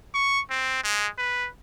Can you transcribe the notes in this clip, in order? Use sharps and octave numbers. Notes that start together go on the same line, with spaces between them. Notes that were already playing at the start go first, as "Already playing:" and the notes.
C#6
C4
G#3
B4